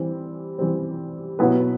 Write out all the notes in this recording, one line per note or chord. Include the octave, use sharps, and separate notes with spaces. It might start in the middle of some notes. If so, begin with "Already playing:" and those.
Already playing: E3 G3 C4
E3 G3 C4
B2 F#3 B3 E4 B4